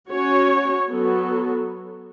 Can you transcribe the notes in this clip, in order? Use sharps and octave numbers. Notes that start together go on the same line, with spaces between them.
C#4 F#4 C#5
F#3 B3 F#4 A4